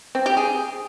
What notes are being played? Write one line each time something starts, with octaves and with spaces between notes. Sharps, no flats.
C4
G4
G#4